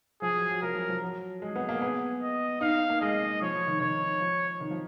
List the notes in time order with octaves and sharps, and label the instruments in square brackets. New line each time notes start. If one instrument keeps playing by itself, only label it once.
[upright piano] F3 [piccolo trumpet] G#4
[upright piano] F#3
F#3
[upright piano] F3 [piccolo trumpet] A#4
[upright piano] F3
F3
F#3
[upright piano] G#3 [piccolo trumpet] G#4
[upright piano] B3
A#3
B3
[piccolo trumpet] D#5
[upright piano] D#4 [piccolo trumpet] F5
[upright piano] A#3
[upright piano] G#3 [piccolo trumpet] D#5
[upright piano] F3 [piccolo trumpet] C#5
[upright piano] F3
D#3
[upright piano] D#3 [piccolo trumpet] C#5
[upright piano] F3
D#3
F3